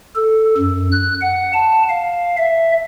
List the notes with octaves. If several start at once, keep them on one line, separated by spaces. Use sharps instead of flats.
A4
F#2
F#6
F#5
A5
F5
E5